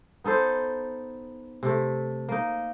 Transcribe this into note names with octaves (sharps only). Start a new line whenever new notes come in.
B3 D#4 A4 C5
C3 A3
A#3 D#4